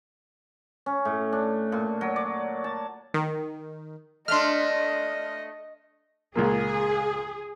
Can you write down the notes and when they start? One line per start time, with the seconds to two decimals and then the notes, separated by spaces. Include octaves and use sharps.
0.86 C#4
1.05 A2
1.33 D4
1.72 A#2
2.01 F#3
2.16 D5
2.64 A5
3.14 D#3
4.28 A3 D4 D#5 C6 F6
6.35 C#2 A#2 A#3 G#4